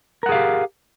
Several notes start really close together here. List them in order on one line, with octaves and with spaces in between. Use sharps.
A#4 F#5 G#4 F5 G4